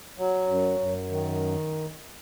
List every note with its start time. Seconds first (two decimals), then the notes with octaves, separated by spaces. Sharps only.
0.18 F#3
0.48 F#2
0.79 F#2
1.10 D#3